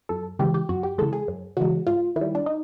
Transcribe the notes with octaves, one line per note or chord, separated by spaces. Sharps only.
F#2 A4
C#3 E3 G#3 G4
G4
F#2 F#4
G4
C#3 E3 G#3 A4
G#4
F#2
C#3 E3 G#3 F#4
G#2 F4
D#3 E4
G3
D4
D#4